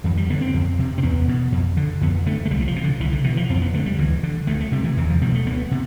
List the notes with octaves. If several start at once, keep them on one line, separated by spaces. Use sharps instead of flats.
F2 E3
G3
D3 B3
C4
F2
C3
C4
E2 B3
B2
F2
D3
F2 B3
D3 A3
A3
C2 G3
E3
F3
C3
D3
C2 E3
D3
B2 E3
F3
F2 C4
B3
D3 A3
G3
D2 E3
D3
D2 A3
A3
C3 G3
E3
E2 E3
F3
B2 G3
A3
D2 B3
C3